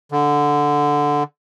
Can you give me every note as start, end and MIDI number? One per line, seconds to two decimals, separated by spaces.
0.12 1.23 50